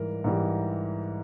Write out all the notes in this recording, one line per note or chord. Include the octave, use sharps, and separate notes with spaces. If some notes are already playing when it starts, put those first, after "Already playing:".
Already playing: G#2 E3 G3 A#4
G#2 E3 G3